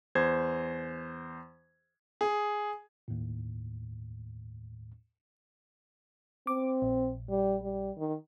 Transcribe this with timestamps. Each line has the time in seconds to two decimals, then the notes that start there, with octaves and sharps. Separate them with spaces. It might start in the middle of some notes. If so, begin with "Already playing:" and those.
0.15 E2 C5 G#6
2.21 G#4
3.08 D#2 A2
6.47 C4 D6
6.82 A#1
7.30 G3
7.63 G3
7.97 D#3